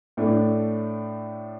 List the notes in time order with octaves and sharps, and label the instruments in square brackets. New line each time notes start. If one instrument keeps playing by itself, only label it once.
[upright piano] A2 A3 D4